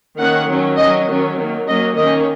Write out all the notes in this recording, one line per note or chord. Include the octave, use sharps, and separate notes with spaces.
D#3 A#3 C#4 F#5
D#3 F#3 C#4
F#3 C#4 D#5
D#3 F#3 C#4
D#3 F#3 A#3
F#3 A#3 C#4 D#5
D#3 A#3 C#4 D#5